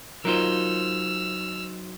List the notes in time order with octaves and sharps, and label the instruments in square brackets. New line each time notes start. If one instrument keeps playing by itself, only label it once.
[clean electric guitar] F#3 D#4 C5 [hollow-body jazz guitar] F4 A#4 [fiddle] E6 F6